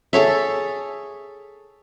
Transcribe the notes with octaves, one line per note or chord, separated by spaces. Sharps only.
G#4 A4 C#5 E5